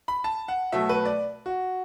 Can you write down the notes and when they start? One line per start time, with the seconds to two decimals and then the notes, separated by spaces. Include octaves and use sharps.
0.08 B5
0.24 A5
0.48 F#5
0.72 B2 F#3 A3 E5
0.89 B4
1.05 D5
1.46 F#4